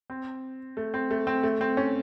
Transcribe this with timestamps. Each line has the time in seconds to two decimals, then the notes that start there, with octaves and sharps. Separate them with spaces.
0.10 C4
0.77 A3
0.94 C4
1.11 A3
1.27 C4
1.43 A3
1.61 C4
1.77 C#4